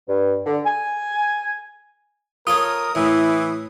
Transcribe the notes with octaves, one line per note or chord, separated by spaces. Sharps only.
G2
D3
G#5
F4 A4 A#4 C#5 D#6
A2 E3 E4